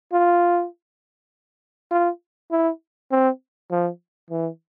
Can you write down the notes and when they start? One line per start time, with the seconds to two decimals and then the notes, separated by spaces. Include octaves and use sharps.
0.12 F4
1.91 F4
2.51 E4
3.11 C4
3.71 F3
4.30 E3